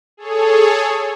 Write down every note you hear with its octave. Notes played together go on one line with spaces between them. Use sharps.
G#4 A4 C#5